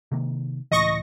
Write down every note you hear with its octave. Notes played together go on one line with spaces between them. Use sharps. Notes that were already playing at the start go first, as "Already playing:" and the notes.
C3 D#3 A#3
C#2 A2 E3 D#5 C#6 A#6